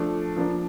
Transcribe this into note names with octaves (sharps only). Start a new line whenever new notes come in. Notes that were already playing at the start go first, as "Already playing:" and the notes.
Already playing: F3 A3 D4
F3 A#3 D4